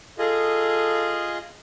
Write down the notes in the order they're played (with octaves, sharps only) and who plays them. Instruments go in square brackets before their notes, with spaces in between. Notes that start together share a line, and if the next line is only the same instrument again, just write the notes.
[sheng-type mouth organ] F4 G#4 D#5 [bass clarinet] A4